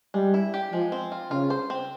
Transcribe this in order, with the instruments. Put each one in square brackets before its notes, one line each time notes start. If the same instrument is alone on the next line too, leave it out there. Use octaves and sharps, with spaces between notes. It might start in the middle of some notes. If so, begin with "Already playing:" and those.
[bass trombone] G3 [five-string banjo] G#3
[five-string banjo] E4
G4
[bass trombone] F3 [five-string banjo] G#3
[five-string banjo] C4
F4
[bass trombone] C#3 [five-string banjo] F4
[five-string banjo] C5
C4